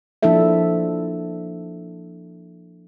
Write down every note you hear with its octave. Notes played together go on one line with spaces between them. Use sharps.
F3 A#3 D4 E4 A4 E5